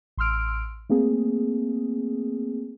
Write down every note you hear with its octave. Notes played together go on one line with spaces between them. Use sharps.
A1 C6 E6 F6 D7
A3 A#3 C4 G#4